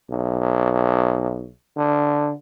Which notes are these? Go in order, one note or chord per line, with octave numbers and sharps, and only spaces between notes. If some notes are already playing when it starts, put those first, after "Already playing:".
B1
D3